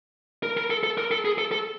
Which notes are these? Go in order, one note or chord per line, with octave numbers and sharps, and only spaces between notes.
A#4
A#4
A4
A4
A#4
A4
G#4
A4
A4